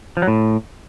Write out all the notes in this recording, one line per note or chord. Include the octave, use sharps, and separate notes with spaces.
F3
F#3
A2